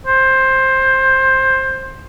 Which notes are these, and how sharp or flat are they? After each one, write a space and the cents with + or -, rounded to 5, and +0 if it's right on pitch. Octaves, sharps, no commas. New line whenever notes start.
C5 +15